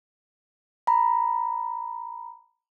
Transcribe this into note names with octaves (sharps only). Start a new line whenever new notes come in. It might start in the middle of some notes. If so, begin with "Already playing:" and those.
A#5 B5